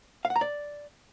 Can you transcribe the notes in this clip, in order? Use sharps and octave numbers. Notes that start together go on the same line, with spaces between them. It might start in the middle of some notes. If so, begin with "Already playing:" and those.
F5
F#5
A#5
D5